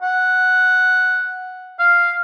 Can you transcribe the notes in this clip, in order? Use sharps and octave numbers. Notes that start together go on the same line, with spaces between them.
F#5
F5